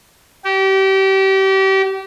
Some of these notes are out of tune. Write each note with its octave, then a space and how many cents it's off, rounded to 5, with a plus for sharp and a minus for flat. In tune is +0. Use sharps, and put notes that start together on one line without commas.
G4 -30